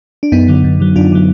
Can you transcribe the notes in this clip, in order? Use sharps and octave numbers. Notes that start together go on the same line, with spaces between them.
D4
F#2 B3 D#4
D3 F#3
F#2
D3 F#3
F#2 D4 F4
D3 F#3